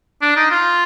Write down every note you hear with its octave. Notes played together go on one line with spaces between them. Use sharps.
D4
D#4
F4